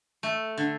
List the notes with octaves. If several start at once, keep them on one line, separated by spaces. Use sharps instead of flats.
A3
D3